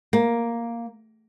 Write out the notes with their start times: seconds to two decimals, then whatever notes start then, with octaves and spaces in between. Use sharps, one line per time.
0.13 A#3